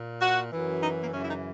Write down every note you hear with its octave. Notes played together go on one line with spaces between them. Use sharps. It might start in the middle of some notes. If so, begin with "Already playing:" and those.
Already playing: A#2
F#4
F#2 E3
D#4
A#3
F#2 C#3 E3 C#4
E4
D#4